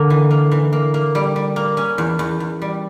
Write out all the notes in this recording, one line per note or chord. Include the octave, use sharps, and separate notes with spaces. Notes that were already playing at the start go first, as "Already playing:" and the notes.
Already playing: D3 A#3
E3
A#3
E3
A#3
A#3
G3
G3
A#3
C#4
E2
E2
E2
G3